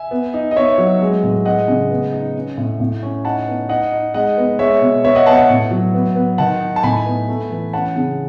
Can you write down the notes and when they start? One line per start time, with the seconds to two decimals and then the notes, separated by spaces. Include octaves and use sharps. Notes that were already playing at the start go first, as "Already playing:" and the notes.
Already playing: E5 G#5
0.11 B3
0.34 D#4
0.51 D#5
0.56 B3 C#5 E5
0.78 F#3
1.01 G#3
1.23 A2
1.45 G#3 D#5 F#5
1.68 C#3
1.90 B3
2.12 D#4
2.35 C#4
2.58 A2
2.80 A2
3.03 C#4
3.25 D#4 F#5 A5
3.48 B3
3.69 D#4 D#5 F#5
3.92 D#4
4.14 G#3 D#5 F#5
4.37 B3
4.59 G#3 C#5 E5
4.81 B2
5.04 B3 C#5 E5
5.15 D#5 F#5
5.26 B3 F#5 A5
5.37 F#5 A5
5.50 A2
5.71 F#3
5.94 B3
6.16 B3
6.38 D#3 F#5 A5
6.61 D#4
6.76 A5
6.83 A2 G#5 B5
7.06 B3
7.29 A3
7.50 E3
7.73 C#4 F#5 A5
7.96 C#3